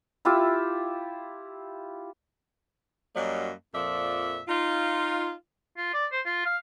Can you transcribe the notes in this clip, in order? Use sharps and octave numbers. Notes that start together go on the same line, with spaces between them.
E4 F4 G4 E5
F#2 F#3 G3 A#3 D#5
F2 A#2 F3 D5 E5
D#4 F4
F4
D5
C5
F4
F5